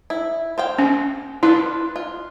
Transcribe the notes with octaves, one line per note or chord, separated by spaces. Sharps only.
E4
C5 F5 G5
C#4
D4 E4 F4 B4
F4